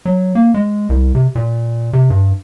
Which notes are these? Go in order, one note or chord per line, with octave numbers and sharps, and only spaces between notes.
F#3
A#3
G#3
C2
C3
A#2
C3
G2